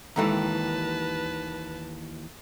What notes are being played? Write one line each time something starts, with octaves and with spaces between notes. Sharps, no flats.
D#2 D#3 E3 G#3 A4 B4 A5 A#5